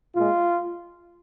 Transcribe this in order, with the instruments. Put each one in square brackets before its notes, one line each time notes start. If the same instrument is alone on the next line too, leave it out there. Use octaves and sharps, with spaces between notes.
[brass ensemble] A#2 G#3 F4